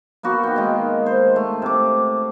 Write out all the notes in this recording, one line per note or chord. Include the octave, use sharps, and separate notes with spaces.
A#3 B3 F#4
D#3 G5
D#3 G#3
C5
A3
C3 D6